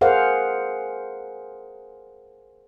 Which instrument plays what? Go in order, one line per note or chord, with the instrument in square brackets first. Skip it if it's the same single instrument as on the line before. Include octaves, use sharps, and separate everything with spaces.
[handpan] G#4 A#4 C5 F5 F#5